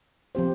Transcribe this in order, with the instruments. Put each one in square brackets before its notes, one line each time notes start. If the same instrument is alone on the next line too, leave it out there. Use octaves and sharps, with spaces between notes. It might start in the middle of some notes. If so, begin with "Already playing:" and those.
[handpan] F3 C4 G4 C5